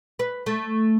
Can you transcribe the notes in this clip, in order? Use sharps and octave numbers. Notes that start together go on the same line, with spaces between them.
B4
A3